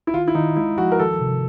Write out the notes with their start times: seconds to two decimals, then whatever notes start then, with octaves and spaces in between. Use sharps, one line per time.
0.07 E4
0.14 D#3 F4
0.28 E4
0.35 D#3 D#4
0.56 G#3 E4
0.78 F3 F#4
0.92 A#4
0.99 D#3 A4
1.21 C3